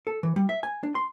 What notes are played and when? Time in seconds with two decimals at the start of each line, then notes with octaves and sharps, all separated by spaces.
0.07 A4
0.23 E3
0.36 G3
0.49 E5
0.63 G#5
0.83 D4
0.95 C6